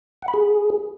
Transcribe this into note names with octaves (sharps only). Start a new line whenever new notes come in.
F#5
B5
G#4